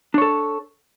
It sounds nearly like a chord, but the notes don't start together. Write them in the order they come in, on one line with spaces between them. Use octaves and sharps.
D4 C#5 A4